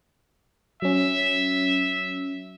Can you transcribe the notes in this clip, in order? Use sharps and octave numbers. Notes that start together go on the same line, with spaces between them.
F#3 C#4 E5